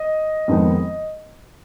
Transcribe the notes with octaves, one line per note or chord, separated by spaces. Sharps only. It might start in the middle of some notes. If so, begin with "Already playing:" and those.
Already playing: D#5
F2 D#3 G#3 B3 D#4